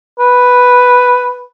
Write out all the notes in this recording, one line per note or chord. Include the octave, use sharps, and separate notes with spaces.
B4